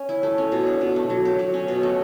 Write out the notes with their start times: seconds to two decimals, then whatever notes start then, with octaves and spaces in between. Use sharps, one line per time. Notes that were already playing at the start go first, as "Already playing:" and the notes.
Already playing: C#4
0.09 E4
0.23 A3
0.38 C#4
0.52 B2
0.67 D4
0.81 B2
0.96 A3
1.10 F#3
1.25 G4
1.39 F#3
1.54 C#4
1.68 B2
1.83 A3